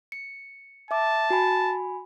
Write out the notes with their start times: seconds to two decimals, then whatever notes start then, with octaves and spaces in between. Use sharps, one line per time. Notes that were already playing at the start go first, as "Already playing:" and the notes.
0.12 C#7
0.91 E5 A5 D6
1.30 F#4 G#5 B5